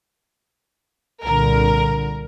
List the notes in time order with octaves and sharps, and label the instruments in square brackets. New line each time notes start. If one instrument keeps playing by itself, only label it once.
[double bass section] C2 A#2 D3 [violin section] A#4